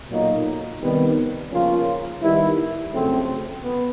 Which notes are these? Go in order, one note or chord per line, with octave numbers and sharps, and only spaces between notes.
B1 A#2 F#3 A#3 D#4
C3 D#3 G3 B3
C#3 F3 A#3 C#4 F4
D#3 G3 B3 E4
F2 C#3 F#3 A3 C4
B3